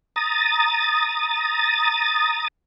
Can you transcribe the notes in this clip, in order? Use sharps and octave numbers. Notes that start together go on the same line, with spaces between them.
A#5 D#6 A6